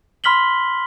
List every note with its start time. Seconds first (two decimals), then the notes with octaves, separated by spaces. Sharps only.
0.24 B5 C6 F6 B6 F#7 G7